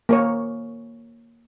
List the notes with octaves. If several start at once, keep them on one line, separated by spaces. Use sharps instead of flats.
A#3 A#4 C#5